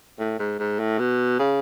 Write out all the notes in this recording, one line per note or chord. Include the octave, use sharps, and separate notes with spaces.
A2
G#2
G#2
A2
B2
C#3